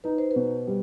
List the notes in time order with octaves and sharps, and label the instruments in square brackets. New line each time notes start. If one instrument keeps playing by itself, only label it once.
[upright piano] D#4 [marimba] B4
[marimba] C5
B4
[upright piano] B2
G3